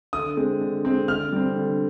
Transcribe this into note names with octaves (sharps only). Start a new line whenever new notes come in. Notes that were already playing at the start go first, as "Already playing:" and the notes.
D3 D#6
G#3 C4
D3
G#3 C4
D3 F6
G3 C4
D3